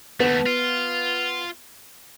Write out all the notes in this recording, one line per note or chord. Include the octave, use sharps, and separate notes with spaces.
D#2 A3 B3
F4